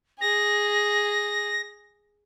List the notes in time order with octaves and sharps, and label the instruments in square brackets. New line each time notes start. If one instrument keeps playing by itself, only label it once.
[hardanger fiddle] G#4 [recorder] A#6